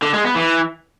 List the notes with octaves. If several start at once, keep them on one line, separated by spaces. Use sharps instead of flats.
D3
G#3
B3
E3